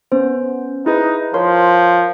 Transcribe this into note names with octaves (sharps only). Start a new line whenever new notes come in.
B3 C#4 C5
D#4 E4 G#4 B4
F3 A#4 C#5 C6